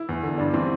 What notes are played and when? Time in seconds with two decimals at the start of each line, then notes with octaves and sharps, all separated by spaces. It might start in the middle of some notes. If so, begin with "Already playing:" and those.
Already playing: E4
0.09 E2
0.23 D3
0.38 G2 D4
0.53 E3 C4